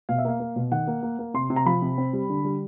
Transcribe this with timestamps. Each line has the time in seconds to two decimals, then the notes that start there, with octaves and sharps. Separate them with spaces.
0.09 B2 F5
0.18 E5
0.25 A#3 F5
0.40 A#3
0.56 B2
0.71 D#3 F#5
0.87 A#3
1.03 A#3
1.19 A#3
1.34 C3 C6
1.50 C3
1.56 A#5
1.66 F3 B5
1.82 C3
1.98 C4
2.13 G3
2.30 D3
2.45 G3